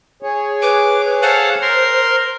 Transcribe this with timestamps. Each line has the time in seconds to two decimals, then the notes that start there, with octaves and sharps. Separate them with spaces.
0.23 G#4 C#5
0.62 B4 D6
1.22 A4 C5 F5 F#5
1.62 A#4 C6